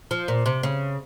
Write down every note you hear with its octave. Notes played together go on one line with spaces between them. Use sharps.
F3
A#2
C3
C#3